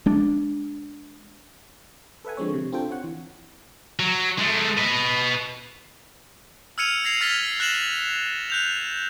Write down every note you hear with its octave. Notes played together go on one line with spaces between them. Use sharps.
G#3 D4
A4 B4 E5 F#5 G#5
D3 F3 G#3 C4 C#5
C3
C4 D4 F4 A4 C5 G5
C4 C#5 F#5
E3
F#3
G#3 A3
B4 D#5
E6 F6 G#6 C#7 D#7 F7
G#6 A#6 C7 F7
F6 A6 B6 F7 G7
F#6 A#6 E7 F#7
F#6 G6 F7